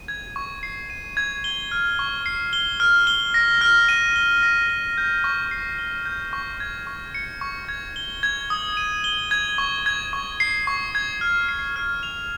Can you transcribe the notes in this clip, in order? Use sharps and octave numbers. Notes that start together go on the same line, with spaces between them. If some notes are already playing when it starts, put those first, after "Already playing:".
Already playing: D#7
G#6
C#6
C7
D#7
G#6
G7
F6
C#6
C7
G7
F6
G7
A#6
F6
D#7
G7
A#6
G7
G6
C#6
C7
G7
G6
C#6
G#6
C#6
C#7
C#6
G#6
G7
G#6
D#6
D#7
G7
G#6
C#6
G#6
C#6
C7
C#6
G#6
F6
C7
F6
F7